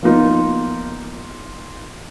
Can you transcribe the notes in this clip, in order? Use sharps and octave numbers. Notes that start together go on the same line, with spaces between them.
F3 A#3 B3 D#4 F4 A#4